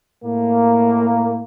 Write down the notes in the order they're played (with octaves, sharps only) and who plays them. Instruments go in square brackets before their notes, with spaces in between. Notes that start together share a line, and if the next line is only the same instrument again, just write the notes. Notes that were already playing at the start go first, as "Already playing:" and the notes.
[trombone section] A2 A#3